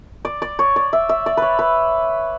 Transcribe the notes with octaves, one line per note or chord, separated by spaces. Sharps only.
D5
D5
C#5
D5
E5
E5
D5
B4 C#5
B4